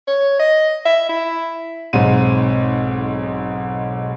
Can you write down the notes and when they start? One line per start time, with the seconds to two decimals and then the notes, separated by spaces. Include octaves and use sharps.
0.08 C#5
0.40 D#5
0.86 E5
1.09 E4
1.93 B1 G#2 C4 D#7